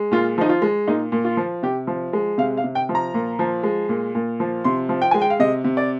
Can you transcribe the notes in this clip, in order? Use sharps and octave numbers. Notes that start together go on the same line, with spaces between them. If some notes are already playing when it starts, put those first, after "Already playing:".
Already playing: G#3
A#2 F4
F3 D#4
F4
G#3
A#2 D#4
A#2
F4
F3
C3 G4
F3
G#3
C3 F5
F5
C3
G5
F3
A#5
A#2
F3
G#3
A#2
A#2
F3
C3 C6
F3
G5
G#3 G#5
G5
F5
C3 D#5
C3
D5